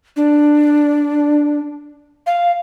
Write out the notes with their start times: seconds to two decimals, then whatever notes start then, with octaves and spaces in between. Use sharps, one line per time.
0.16 D4
2.27 F5